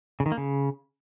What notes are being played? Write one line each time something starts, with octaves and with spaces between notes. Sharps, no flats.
C#3
D#3
A#3
C#3